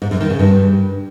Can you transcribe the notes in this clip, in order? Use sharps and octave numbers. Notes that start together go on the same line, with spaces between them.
G#2
F#2
D#3
C#3
G2